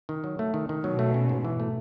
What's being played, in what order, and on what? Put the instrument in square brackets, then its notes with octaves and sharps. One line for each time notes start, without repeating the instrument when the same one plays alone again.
[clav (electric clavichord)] D#3
F#3
A3
D#3
D#3
[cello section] B2 [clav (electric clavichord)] F#3
[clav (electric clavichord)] A3
C#4
G#2
E3
A3